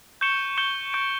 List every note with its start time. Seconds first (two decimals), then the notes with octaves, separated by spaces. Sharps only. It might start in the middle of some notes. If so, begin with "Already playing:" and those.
0.21 C#6 G6 C#7 E7 G7
0.57 C#6 G6 C#7 E7 G7
0.93 C#6 G6 D7